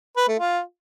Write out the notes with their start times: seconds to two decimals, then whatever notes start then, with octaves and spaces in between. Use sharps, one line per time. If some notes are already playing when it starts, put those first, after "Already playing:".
0.17 B4
0.28 A3
0.39 F4